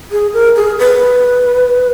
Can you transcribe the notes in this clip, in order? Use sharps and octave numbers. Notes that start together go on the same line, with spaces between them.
G#4
A#4
G#4
B4